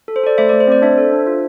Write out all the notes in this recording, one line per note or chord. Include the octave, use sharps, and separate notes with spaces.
A4
C5
A4 D5
A3 C5 E5
A3 D5
C5
C4 D5
D4 C5 E5
A4
D4
F4